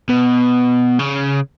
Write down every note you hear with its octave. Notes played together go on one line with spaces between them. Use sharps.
B2
C#3